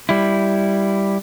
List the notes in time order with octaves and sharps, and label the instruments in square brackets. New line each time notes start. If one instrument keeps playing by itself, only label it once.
[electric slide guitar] G3 E4